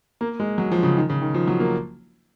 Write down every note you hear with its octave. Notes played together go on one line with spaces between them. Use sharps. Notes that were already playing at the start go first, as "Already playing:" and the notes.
A#3
G#3
F#3
F3
C#3
D#3
C#3
D#3
F3
F#3
A#3